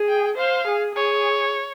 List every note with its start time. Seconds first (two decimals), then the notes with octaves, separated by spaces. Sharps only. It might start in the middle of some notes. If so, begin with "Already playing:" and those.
Already playing: G#4
0.09 G5
0.37 C5 F5
0.67 G#4
0.95 G#4 C#5